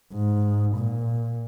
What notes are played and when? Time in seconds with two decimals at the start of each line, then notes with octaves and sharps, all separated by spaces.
0.13 G#2
0.77 A#2